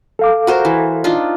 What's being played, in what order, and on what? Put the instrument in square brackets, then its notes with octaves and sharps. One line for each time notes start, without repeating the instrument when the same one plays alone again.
[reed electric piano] A4 F5 D6
[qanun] F#4 A#4 C5
E3
D4 D#4 F4